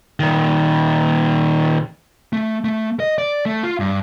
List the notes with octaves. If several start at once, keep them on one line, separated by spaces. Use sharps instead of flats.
A#2 D#3
A3
A3
D#5
D5
A3
F4
G2